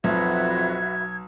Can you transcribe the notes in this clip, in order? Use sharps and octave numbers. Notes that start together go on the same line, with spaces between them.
B1 F2 F#4 B4 E5 G#6